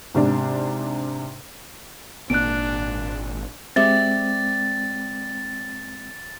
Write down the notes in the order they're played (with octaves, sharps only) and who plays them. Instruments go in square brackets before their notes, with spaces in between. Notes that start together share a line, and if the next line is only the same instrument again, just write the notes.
[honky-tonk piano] G#2 C3 D4
[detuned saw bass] G#1 [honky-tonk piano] A#2 [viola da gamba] D4 [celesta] F#6 D7
[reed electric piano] G#3 C4 [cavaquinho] G4 D5 E5 [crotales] A6